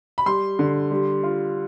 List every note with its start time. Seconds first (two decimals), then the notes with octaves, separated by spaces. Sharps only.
0.18 B5
0.26 G3 C6
0.59 D3
0.91 G3
1.23 F4